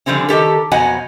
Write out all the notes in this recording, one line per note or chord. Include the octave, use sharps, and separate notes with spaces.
D3 F3 G3 C4 C#4
D#3 G3 G4 A4
F2 B2 F#3 D#5 F#5 G#5